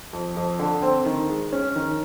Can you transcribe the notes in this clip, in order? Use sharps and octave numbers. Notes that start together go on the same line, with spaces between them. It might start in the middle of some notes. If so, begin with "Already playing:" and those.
F2
F2
D3
C4
D#3
G#3
C#4
D#3